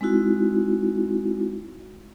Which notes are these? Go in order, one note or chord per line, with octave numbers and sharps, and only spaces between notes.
G#3 C4 D#4 E4 F#4